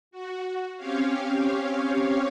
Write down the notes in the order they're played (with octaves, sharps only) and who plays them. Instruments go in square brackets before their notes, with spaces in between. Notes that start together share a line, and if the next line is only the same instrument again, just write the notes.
[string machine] F#4
C4 C#4 G4 C#5 F5